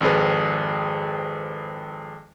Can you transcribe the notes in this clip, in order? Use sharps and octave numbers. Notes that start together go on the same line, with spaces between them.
G#1 F2 C4 G#4 B4